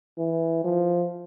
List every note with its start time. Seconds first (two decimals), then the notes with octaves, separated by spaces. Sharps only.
0.18 E3
0.64 F3